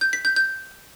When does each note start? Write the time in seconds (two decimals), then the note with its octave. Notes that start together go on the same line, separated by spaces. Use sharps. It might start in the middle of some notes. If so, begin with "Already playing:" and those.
0.01 G6
0.13 B6
0.25 G6
0.36 G6